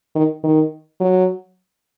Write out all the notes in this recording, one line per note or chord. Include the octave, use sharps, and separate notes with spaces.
D#3
D#3
F#3